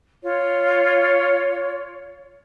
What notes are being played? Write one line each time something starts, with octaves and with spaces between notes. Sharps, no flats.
F4 C#5